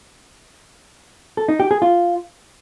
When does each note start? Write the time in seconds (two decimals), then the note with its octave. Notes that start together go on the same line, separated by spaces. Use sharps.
1.37 A4
1.48 D#4
1.60 G4
1.71 G#4
1.82 F4